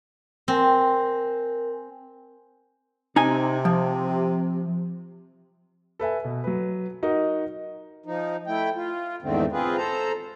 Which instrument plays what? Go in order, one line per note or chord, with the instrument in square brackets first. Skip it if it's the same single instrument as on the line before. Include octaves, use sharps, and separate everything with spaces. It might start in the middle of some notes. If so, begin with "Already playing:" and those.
[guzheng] C4 [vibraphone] A#4 G#5
[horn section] C3 [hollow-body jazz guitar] D#4 G#5
[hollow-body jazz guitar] F3
[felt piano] A4 B4 E5 G#5
B2
F#3 B4
D#4 F#4 A#4 D#5
[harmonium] F3 D#4
A3 E4 G5
F4
E2 G#2 D3 D#3 A3 C4
C4 F4 G#4 B4
A4 C5 A#5